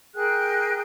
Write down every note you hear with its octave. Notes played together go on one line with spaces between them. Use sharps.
G#4 A#4 G5 F#6